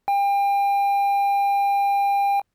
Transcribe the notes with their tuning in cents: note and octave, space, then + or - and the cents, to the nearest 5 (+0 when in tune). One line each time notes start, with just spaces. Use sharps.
G5 +35